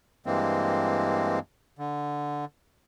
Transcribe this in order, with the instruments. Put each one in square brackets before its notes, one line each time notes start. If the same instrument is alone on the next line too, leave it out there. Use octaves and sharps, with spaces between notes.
[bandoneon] G2 E3 G#3 A#3 C4
D3